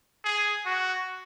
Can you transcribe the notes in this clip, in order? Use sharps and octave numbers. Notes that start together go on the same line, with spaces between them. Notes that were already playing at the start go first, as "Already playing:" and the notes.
G#4
F#4